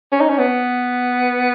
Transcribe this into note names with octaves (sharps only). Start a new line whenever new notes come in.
C#4
D#4
C#4
B3